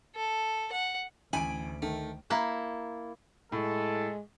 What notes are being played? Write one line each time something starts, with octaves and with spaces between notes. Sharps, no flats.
A4
F#5
A1 D2 G#5 B5 D7
D#3 A3
A#3 E4 A5
A2 G#3 A4